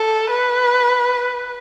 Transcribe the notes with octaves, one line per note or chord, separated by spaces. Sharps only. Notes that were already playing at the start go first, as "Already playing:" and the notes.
Already playing: A4
B4